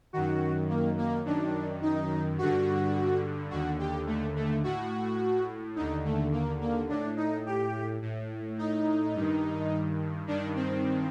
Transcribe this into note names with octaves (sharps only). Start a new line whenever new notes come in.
F#2 D#3 F#4
A#3
A#3
F#2 D#3 D4
D#4
G2 D3 F#4
D#2 D3 F#4
G4
A3
A3
A2 F#4
D#2 D3 D#4
A3
A#3
A#3
A2 D4
D#4
G4
A2
D#4
G2 D#3
G2 D#3 D4
C4